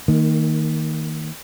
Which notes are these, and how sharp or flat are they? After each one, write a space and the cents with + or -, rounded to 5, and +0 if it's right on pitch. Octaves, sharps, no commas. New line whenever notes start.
D#3 +5 A#3 -30